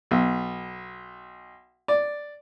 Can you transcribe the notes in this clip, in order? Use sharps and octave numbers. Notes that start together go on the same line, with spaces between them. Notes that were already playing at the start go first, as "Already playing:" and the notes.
B1
D5